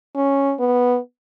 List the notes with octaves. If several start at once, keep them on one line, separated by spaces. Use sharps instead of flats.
C#4
B3